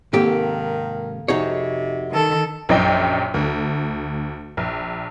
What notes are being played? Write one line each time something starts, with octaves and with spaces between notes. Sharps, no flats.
G#2 C3 D#3 A#3 G4 A4
F2 C3 D#4 F#4 G#4 C#5
D#3 A4
A#1 F#2 D#5 G5
D2
A#1